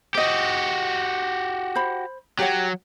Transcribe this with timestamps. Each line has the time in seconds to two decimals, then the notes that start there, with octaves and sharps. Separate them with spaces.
0.15 F#4 G4 C5 D#5
1.76 C5 B5
2.39 F#3 G4 C#5 F#5